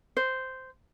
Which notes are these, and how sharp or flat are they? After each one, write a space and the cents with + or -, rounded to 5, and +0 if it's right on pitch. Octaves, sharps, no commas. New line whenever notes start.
C5 -10